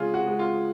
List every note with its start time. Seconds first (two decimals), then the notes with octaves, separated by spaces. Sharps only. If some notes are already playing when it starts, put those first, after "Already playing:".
Already playing: C#3 G#3 F4 G#4
0.14 F#4
0.27 G#3
0.39 F4